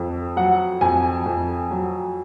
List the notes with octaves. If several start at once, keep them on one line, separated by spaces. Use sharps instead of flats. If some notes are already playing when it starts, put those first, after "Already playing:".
Already playing: F2
F#3 F#5
F2 G#5
F2
F#3